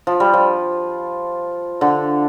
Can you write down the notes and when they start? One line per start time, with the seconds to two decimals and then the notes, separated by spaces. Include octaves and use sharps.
0.07 F3
0.20 G3
0.34 F3
1.81 D3